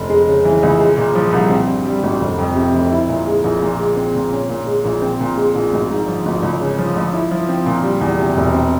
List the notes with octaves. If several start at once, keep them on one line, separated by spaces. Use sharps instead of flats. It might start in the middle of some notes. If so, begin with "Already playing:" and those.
Already playing: F1
G#3
C#3
E3
C#2
G#3
A#2
F3
C2
C4
G2
G3
G#1
F1
F2
C3
F1
E4
A#2
G#3
A#1
A#2
G#3
C4
A#2
C#4
A#2
G#3
A#1
C4
A#2
G#3
A#1
G#1
G#2
F3
G#1
C#2
C#3
F3
C#2
E4
F3
C4
A#2
G3
E2
C3
E1
C4